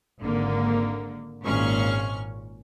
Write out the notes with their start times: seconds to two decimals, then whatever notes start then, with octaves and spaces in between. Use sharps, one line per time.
0.21 G#1 D3 A#3
1.44 G#1 A#2 C#4 C#6 F6